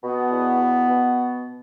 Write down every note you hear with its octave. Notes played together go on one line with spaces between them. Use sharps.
B2 B3
E2
B2
B2